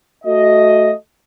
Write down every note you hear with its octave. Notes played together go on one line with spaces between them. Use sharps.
A3 F#4 D#5